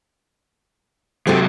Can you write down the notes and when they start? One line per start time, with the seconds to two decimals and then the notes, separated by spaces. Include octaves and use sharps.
1.27 C3 F#3 C4 G4 A4